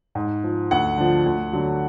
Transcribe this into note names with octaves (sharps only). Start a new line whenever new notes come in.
G#2
F3
D2 F#5
D3 F3
D2
D3 F#3